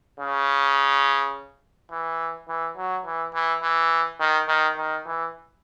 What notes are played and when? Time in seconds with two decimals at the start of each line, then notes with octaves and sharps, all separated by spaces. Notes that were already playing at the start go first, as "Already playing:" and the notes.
0.20 C#3
1.91 E3
2.48 E3
2.76 F#3
3.06 E3
3.34 E3
3.62 E3
4.20 D#3
4.48 D#3
4.77 D#3
5.06 E3